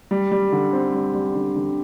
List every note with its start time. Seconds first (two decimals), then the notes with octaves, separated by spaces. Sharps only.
0.11 G3
0.32 G3
0.52 D3
0.73 C4
0.94 G3
1.14 G3
1.35 D3
1.56 D3